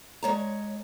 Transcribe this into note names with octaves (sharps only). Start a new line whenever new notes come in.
G#3 C#5 A#5